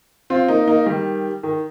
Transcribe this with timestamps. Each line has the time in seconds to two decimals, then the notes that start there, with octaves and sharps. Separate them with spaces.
0.30 C4 F4
0.48 A#3 D#4
0.67 A#3 D#4
0.86 D#3 G3
1.43 D#3